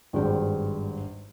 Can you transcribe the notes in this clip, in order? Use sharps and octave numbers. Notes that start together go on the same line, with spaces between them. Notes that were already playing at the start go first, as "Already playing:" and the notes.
G#1 G2 G#4 C5 G5